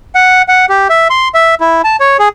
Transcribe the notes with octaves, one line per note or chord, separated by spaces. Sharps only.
F#5
F#5
G4
E5
C6
E5
E4
A5
C#5
G#4